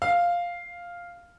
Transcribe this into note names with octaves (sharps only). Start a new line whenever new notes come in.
F5